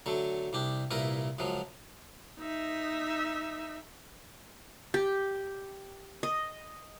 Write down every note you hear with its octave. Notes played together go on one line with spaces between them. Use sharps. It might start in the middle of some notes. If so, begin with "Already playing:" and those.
D3 F#3 A3
C2 D4 G4
C2 A#2 E4 A#4 B4
C#2 F#2 F3 F#3
D#4 E5
G4
D#5